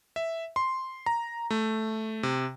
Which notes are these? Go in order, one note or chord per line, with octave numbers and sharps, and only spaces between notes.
E5
C6
A#5
A3
C3